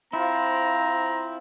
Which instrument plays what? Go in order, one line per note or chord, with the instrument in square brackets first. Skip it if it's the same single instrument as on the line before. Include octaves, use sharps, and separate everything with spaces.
[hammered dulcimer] F3 F4 [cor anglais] C4 [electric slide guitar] E4 [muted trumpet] A#5